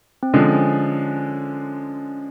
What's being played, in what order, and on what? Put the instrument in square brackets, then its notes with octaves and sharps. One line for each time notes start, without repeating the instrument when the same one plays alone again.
[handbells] C4
[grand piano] D3 F3 G#3 [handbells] C#4